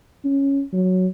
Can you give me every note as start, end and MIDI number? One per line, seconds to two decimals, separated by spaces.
0.24 0.62 61
0.73 1.07 54